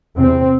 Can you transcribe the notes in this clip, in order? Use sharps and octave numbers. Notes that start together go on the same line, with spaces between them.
E2 C3 C4